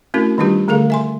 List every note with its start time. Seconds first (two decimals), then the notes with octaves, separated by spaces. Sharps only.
0.14 A3 C4 C#4 E4 F#4 A#4
0.38 D#3 G3 D4 F4 G4 B4
0.68 D3 A3 G#4 A#4 F5
0.90 E5 G#5 C6